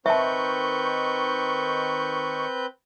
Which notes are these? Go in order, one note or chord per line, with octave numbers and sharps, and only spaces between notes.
D#3 C4 B4 E5 A5 C#6 G6